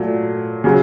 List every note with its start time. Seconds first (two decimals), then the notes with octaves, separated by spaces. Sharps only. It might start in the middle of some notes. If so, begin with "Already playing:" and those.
Already playing: A#2 F#3 A3
0.64 C#3 F#3